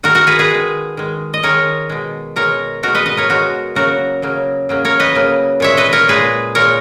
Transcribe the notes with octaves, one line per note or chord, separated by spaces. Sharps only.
D#3 G#3 F#4 A#4
F#4 A#4
G#4 B4
G#4 B4
D#3 G#3
D#3 G#3
D#5
D#3 G#3 A#4 C#5
B2 G#3
B2 G#3 A#4 C#5
B2 G#3 F#4 A#4
B4 D#5
B4 D#5
A#4 C#5
B2 G#3 F#4 A#4
C#3 F#3 A#3 F#4 A#4
C#3 F#3 A#3
C#3 F#3 A#3
A#4 C#5
B4 D#5
C#3 F#3 A#3
A#2 G#3 C#5 E5
B4 D#5
A#4 C#5
A#2 G#3 G#4 B4
A#2 G#3 A#4 C#5